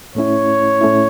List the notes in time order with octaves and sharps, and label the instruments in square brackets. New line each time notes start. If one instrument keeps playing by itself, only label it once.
[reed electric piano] A2 A3 C#4 E4 [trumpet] C#5
[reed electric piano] A2 A3 C#4 E4